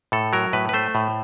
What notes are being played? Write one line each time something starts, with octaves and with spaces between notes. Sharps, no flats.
A2 A4
F#3 A#4
A2 B4
B4
A3 C5
A2